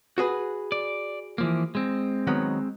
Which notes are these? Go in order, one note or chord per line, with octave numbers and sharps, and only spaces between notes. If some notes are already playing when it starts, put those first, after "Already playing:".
F#4 G#4 B4
D5
E3 F3 A#3
G#3 C4
D#3 F#3 B3